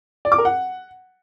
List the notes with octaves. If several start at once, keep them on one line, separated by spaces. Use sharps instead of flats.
D5
D6
A#4
F#5